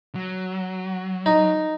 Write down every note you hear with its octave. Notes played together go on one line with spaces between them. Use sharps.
F#3
D#4